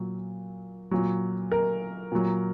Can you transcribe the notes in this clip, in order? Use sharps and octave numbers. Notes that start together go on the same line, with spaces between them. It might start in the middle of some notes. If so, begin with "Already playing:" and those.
Already playing: A#2 F#3
A#2 F#3
A#4
A#2 F#3